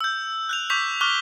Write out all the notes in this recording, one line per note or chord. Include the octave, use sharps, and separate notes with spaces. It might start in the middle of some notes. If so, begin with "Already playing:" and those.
E6 G6
F#6 G6 F7
C#6 D6 G6 B6 F7
C#6 D6 F6 F#6 G7